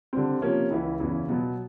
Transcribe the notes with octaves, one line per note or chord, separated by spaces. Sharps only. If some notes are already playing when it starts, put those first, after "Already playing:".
D3 G3 C4
C3 F3 A#3 C#4
C#2 C#3 E3
E2 C#3 E3
B2 F#3 B3